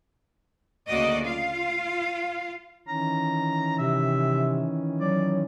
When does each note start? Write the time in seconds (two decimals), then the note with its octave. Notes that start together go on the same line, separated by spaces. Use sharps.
0.88 D2 C#3 A#3 F#4 D5 D#5
1.23 F4 F5
2.88 D#3 E3 C#4 A#5
3.78 C3 E5
5.00 F#3 D5